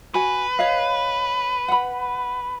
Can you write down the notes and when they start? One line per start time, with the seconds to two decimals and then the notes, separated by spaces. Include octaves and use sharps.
0.14 F#4 B4 G#5
0.59 C#5 D#5 F5
1.68 F#5 B5